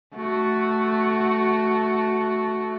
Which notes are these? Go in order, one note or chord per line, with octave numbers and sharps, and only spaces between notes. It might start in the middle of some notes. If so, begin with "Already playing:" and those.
A3 F#4